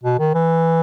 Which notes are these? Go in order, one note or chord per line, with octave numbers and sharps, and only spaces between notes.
B2
D#3
E3